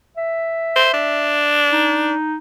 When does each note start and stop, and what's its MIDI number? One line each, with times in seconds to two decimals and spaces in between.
0.17 1.55 76
0.76 0.90 72
0.94 2.14 62
1.72 2.36 63